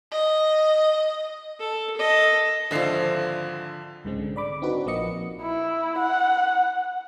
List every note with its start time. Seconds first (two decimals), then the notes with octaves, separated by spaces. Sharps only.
0.12 D#5
1.60 A4
1.96 A4 D#5
2.71 G#1 D3 F3 E5 C7
4.04 C2 G#2 C#3 G#3 C4
4.19 D3
4.36 D5 B5 D6
4.62 C4 D4 D#4 F#4 B4
4.86 A#1 F3 A#3 D#5 C#7
5.42 E4
5.98 F#5